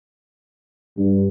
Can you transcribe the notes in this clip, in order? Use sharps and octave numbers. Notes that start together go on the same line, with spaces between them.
G2